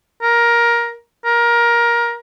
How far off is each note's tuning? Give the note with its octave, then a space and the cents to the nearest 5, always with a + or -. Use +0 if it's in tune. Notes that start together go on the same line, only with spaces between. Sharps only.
A#4 +15
A#4 +20